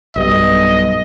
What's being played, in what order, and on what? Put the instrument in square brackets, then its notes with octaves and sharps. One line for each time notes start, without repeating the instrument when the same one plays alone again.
[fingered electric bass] B1 G2 B2 [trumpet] D#5